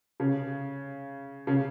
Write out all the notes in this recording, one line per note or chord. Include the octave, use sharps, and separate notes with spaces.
C#3
C#3